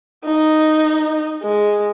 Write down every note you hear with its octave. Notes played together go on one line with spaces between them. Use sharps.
D#4
G#3